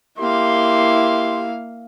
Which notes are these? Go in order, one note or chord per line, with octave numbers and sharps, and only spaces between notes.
A#3 E4 G4 F5 C6